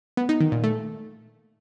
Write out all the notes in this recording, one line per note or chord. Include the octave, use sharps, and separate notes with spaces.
B3
D#4
D#3
A#2
A3